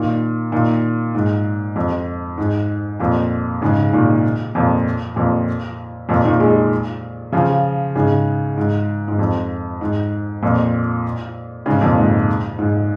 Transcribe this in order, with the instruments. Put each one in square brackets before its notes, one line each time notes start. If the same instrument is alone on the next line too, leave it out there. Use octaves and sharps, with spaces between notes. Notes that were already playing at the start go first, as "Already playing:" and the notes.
Already playing: [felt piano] A#2 D#3
A#2 D#3
G#2
F2
G#2
F2 A#2
G#2 C#3
A#2 D#3
F2 A#2
F2 A#2
F2 A#2
A#2 D#3
D#3 G#3
C#3 F3
G#2 C#3
G#2
G#2
F2
G#2
F2 A#2
G#2 C#3
F2 A#2
G#2
G#2